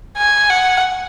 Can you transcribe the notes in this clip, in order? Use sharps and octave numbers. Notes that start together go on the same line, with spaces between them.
G#5
F#5